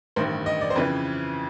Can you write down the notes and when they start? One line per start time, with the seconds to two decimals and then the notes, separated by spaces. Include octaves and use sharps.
0.16 A1 G2 D#3 C5
0.46 D#5
0.61 D5
0.70 C5
0.76 F2 C#3 E3 B4